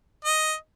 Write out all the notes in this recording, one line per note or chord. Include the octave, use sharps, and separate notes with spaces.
D#5